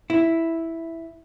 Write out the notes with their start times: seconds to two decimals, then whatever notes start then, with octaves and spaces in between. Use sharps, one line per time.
0.10 E4